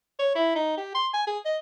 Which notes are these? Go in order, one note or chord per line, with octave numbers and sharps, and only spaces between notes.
C#5
E4
D#4
G4
C6
G#5
G#4
D#5